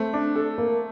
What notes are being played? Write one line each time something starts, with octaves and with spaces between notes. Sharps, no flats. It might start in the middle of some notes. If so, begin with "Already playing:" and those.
Already playing: A3 C4
D4
A4
A#3